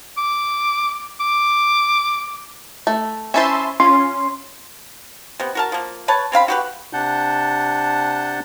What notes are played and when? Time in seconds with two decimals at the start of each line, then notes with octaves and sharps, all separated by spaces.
0.18 D6
1.20 D6
2.87 A3
3.34 C#4 E4 C5 E5 A5 C6
3.80 C#4 F4 C6
5.40 C3 B3
5.55 F#4 A#4 A5
5.72 F3 A#3
6.08 B4 C#5 A5
6.32 C#3 C4 F5 B5
6.48 F#4 G4 B4
6.93 C3 D4 F#5 A5 G6